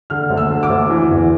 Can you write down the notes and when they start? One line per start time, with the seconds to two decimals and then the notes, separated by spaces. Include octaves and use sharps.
0.10 D3 F6
0.30 D2
0.37 E6
0.50 D3
0.63 D6
0.70 D2
0.89 E3
1.11 E2